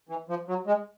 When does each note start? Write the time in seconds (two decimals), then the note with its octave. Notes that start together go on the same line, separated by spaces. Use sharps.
0.09 E3
0.29 F3
0.48 F#3
0.67 G#3